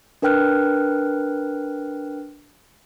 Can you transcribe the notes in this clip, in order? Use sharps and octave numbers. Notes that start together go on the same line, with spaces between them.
D4 A#4 B4 G5 F6 F#6